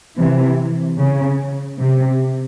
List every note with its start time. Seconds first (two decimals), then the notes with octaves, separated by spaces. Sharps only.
0.17 C3 E3
0.98 C#3
1.79 C3